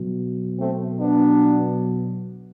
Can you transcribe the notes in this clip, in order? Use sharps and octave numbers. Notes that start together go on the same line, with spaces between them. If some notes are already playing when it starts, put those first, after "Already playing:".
Already playing: B2 F#3
A3 C4
B3 D4